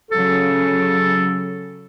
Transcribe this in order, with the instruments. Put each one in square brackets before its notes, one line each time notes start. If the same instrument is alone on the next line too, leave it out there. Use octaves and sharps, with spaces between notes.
[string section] C#3 F#3 [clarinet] A4